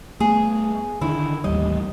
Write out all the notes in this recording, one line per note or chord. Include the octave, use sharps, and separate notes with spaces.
A3 B3 G#4
D3 D#3 E4
A1 D#2 G3 D#5